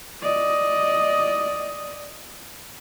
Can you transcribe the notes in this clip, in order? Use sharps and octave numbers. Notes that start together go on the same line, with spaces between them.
D5 D#5